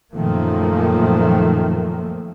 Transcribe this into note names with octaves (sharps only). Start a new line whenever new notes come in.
F#2 A#2 D#3 F3 A3 A#3